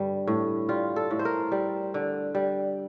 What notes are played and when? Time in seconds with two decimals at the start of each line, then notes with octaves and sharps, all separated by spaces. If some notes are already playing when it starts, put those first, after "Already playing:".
Already playing: G2 D3 G3
0.27 A2
0.69 G3 F4
0.96 A4
1.11 A2
1.19 C5
1.25 A#4
1.52 G3
1.94 D3
2.35 G3